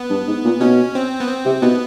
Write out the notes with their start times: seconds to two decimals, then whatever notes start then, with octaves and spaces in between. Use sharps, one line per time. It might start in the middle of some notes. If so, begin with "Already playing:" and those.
Already playing: B3
0.10 G2
0.28 G#2
0.44 A#2
0.61 B2 C#4
0.95 C4
1.20 B3
1.28 C4
1.45 C3
1.62 B2 B3